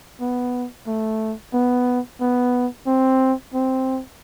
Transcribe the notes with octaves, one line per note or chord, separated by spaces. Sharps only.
B3
A3
B3
B3
C4
C4